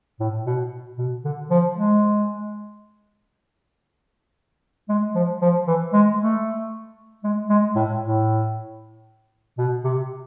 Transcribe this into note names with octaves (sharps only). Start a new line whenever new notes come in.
A2
B2
B2
D3
F3
G#3
G#3
F3
F3
E3
G#3
A3
G#3
G#3
A2
A2
B2
C3